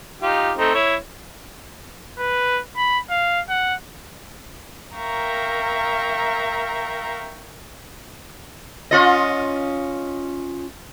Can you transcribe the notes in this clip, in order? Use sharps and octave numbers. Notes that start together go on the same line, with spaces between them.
D#4 F4 G4
A3 C4 D#4
E4 C#5
B4
B5
F5
F#5
A#4 E5 F5 G5 A#5 C#6
C#4 F4 D#5